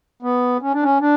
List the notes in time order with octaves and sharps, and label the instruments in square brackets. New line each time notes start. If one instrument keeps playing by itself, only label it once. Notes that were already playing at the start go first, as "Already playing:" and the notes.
[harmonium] B3
C#4
D4
C#4
D4